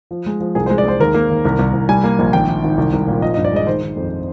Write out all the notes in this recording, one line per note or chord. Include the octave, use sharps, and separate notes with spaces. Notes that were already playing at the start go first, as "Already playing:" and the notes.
F3
G#3
F3
C2 G#4
C5
G#3
D5
G#3 C5
D#2 A#4
A#3
D#2
C2
C2
C2
G3 G#5
A#3
A#1
G#1 G5
G#1
G#1
C2
C2
A#2
F3 D#5
D#5
G2
D5
G#3 D#5
D#3 C5
D#3
F2